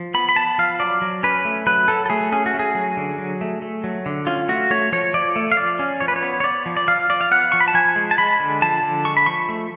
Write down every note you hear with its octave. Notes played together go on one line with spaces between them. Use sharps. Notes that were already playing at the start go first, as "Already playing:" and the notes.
Already playing: F3
B3 B5
B5
B3 A5
F3 F5
F#3 D5
F#3
C#4 B4
A3
F#3 B4
F#3 A4
A4
A3 G#4
C#4 G#4
F#4
A3
G#4
F#3
D3
F#3
A3
A3
F#3
D3
C#4 F4
A3 F#4
A3 C#5
F3 C#5
F3 D5
A3
F5
F3 D5
C#4
F3 C#5
B4
C#5
B3
C#5
B3 D5
F3
D5
F3 F5
F3 D5
F5
B3 F#5
F3 C#6
B5
A5
F3 G#5
G#3
A5
G#3 B5
D3
F3 A5
D3
G#3 C#6
B5
F3 C#6
A3